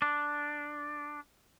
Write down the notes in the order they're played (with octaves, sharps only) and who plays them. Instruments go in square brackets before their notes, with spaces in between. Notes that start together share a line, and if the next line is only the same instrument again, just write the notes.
[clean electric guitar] D4